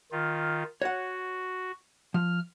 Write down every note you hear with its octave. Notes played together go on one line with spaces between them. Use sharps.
D#3 F4
F#4 C#5 F#5
F3 F6